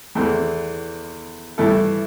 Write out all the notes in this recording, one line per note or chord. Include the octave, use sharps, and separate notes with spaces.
E2 E3 A3 C4
G2 E3 A3 E4 A4